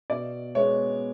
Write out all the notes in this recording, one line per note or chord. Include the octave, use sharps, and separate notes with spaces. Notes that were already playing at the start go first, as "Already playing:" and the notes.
B2 D5
G#3 B3 C#5